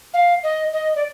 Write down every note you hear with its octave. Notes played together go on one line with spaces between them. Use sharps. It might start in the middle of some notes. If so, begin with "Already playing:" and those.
F5
D#5
D#5
D5